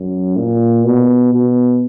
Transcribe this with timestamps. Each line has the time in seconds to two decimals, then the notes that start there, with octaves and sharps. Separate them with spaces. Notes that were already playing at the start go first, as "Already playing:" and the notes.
Already playing: F#2
0.37 A#2
0.85 B2
1.33 B2